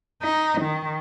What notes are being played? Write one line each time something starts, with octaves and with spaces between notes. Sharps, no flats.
D#4
D#3